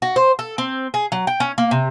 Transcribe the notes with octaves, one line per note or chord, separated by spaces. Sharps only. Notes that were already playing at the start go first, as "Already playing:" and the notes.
F#4
C5
A4
C4
G#4
F#3
G5
C#4
A#3
C3